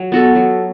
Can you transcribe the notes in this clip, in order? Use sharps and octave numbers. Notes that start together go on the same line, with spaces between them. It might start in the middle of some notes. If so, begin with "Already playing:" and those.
Already playing: F#3
B3 F#4 A4
F#3